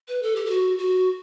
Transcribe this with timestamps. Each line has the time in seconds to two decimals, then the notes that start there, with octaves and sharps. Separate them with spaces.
0.08 B4
0.22 A4
0.36 G4
0.46 G4
0.50 F#4
0.78 F#4